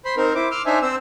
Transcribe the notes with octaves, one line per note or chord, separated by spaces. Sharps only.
C5 B5 C6
C4 D#4 A#4 C5
E4 C5 D6
C6 D6 E6 F6
D4 D#4 C5 E5 G#5
C4 C5 E6